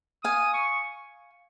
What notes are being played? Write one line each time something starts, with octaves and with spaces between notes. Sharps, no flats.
F5 G#5 D#6
C#6